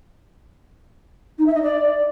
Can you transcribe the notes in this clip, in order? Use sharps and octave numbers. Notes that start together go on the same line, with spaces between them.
D#4
E5
D#5
D5